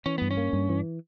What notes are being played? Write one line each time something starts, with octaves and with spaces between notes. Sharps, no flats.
E3 C#4
G2 B3
C#4
A#3
G2
E3